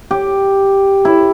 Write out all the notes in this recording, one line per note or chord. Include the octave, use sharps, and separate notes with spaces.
G4
E4